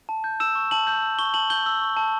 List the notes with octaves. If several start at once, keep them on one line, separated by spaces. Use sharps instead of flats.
A5
G6
E6 E7
C#6
A5 F#7
G6
E6
C#6 G7
A5 F#7
G6 G7
E6
C#6
A5